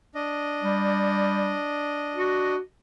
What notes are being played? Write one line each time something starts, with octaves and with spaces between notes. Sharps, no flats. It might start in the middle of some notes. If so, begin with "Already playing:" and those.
D4 D#5
G3
F#4